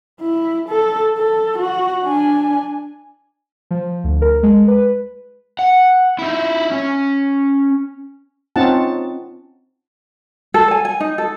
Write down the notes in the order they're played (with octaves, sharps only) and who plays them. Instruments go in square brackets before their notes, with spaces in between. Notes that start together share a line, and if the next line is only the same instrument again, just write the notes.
[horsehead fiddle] E4
A4
A4
F#4
D4 G#5
[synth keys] F3
D2
A#4
G#3
B4
[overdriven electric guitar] F#5
D#4 E4
C#4
[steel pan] C4 C#4 D#4 F4 F#5 A5
[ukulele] A4
G#5
G#5
D#4
A4